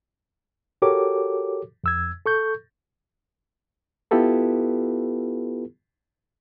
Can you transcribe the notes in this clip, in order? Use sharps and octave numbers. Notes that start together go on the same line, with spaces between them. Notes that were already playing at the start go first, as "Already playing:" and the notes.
F#4 G4 A4 A#4 C#5 D6
F2 E6 G#6
A4 C#6 G6
B3 E4 F4 G4 A4 B4